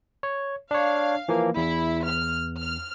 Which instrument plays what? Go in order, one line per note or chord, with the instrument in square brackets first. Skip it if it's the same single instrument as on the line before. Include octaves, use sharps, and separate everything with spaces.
[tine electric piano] C#5
[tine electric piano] D4 C#5 [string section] F5
[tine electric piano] E3 F3 A#3
[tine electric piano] E2 [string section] E4
[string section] F6
F6